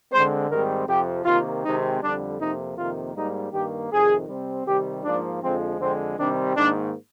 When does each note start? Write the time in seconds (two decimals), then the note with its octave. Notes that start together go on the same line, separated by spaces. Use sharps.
0.12 D3 G#3 C4 C5
0.49 G#2 D#3 G3 C4 A#4
0.88 F2 C3 F3 G4
1.25 C3 D#3 A#3 F4
1.63 C3 D#3 G#3 C4 D#4
2.01 F2 D3 G3 D4
2.39 F2 C3 F3 A#3 D#4
2.76 F2 C3 D#3 A#3 F4
3.15 G#2 G3 A#3 D#4
3.52 G2 D#3 A#3 G4
3.91 F2 C3 D#3 G#4
4.28 C3 G3 C4
4.66 C3 D#3 G3 G4
5.04 G#2 F3 A#3 D4
5.42 F2 D3 F3 G#3 C4
5.80 F2 D3 G#3 C4
6.18 C3 D#3 G3 C4 D4
6.55 G#2 D#3 A#3 D4